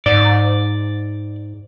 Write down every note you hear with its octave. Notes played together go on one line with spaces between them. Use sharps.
G#2 D5